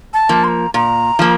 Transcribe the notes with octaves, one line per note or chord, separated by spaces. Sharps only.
A5
F3 A#3
C6
A#5
A#2 A#5
F3 A#3